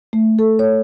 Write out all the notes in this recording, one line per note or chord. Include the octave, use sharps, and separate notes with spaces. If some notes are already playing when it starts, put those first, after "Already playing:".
A3
A4
C#5